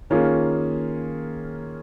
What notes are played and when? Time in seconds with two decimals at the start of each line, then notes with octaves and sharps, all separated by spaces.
0.10 D#3 A#3 C#4 F4 G#4